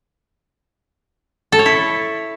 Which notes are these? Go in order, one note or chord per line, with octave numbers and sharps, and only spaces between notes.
A4
C#5
E4